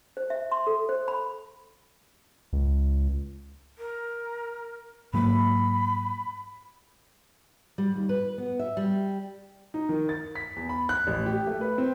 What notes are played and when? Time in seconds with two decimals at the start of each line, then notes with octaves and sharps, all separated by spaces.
0.17 C5
0.30 E5
0.52 C6
0.67 A4
0.89 C5
1.08 B5
2.53 C#2
3.78 A#4
5.13 G#2 F#3 A#3 B5
7.78 G3
7.96 D#2
8.09 B4
8.38 B3
8.59 E5
8.77 G3
9.74 D#4
9.89 D#3
10.09 A6
10.35 B6
10.56 E2
10.69 B5
10.89 F#6
11.07 A1
11.26 G4
11.47 A3
11.61 B4
11.78 C4